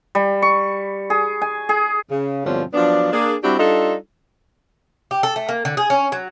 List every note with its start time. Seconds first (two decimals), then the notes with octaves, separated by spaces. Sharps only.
0.15 G3
0.42 C#6
1.10 G#4
1.42 G#5
1.69 G#4
2.10 C#3
2.45 G2 B2 D3 F3 C4 C#4
2.74 F3 F#3 B3 D4
3.12 A#3 D4 G#4
3.43 G3 C4 D4 E4 F#4 G4
3.59 G3 D4 D#4 F4 A4
5.11 G4
5.23 A4
5.36 A3
5.49 A#3
5.65 D3
5.77 G#4
5.90 C#4
6.12 F#3